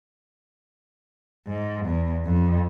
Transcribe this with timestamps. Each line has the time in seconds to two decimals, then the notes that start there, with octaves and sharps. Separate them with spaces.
1.47 G#2
1.85 E2
2.25 F2